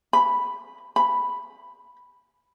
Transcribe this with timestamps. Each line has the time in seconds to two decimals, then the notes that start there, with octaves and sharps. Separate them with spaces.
0.13 B5
0.96 B5